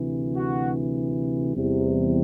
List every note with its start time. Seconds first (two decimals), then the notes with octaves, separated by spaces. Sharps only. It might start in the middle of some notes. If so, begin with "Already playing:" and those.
Already playing: D2 C3 E3
0.37 F#4
1.53 E2 C3 G3